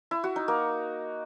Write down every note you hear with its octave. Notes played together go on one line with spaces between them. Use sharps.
E4
F#4
D#4
A#3